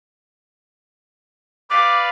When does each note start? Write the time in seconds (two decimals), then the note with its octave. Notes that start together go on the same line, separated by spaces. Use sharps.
1.70 B4 D5 F5 D6